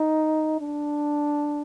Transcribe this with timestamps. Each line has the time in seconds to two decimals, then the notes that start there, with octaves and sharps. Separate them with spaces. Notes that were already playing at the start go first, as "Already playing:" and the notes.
Already playing: D#4
0.60 D4